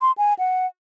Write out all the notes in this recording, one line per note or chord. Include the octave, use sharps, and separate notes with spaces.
C6
G#5
F#5